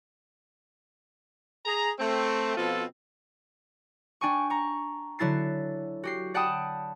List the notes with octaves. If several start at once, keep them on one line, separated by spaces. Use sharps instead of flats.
G#4 A#5
A3 C4
B2 F3 C4 F4 A4
D4 G5 G#5 C#6
A#5 C#6
D3 F#3 E4 A6 C7
F#4 G4 C7
D5 F#5 G5 A5 B5 D#6